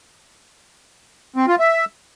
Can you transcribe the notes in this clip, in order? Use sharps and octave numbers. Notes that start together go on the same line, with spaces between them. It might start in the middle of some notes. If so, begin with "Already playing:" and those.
C4
F4
E5